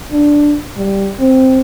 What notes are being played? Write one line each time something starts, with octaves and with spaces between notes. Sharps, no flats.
D4
G3
C4